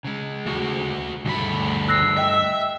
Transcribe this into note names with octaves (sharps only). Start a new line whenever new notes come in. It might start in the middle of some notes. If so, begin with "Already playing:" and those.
C#3 G#3
A3 F#4
D2 G2 A3 B5
E6 F#6 A#6 C7
D#5 E5 G5